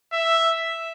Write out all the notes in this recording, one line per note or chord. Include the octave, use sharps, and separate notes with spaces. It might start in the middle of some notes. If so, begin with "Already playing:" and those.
E5